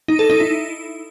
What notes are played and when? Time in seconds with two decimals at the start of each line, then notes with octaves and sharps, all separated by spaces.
0.08 D#4
0.19 A4
0.30 D#4
0.40 E4